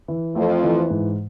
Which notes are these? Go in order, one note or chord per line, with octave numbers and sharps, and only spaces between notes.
E3
F2 F3 A3
E3
G#2